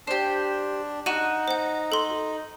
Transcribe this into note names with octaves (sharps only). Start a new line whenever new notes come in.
D4 G4 C5
D#4 F#4 D#7 E7
C5 F#5
A4 C6